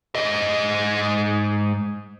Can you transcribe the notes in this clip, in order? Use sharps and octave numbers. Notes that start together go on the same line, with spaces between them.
G#2 D#5